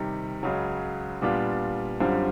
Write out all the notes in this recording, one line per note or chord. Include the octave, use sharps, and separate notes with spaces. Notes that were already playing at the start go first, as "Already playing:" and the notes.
Already playing: C3 D#3 G3
C#2 C#3 F#3
A#2 G3 B3 D4 F4
F#2 D3 G3 C4 F4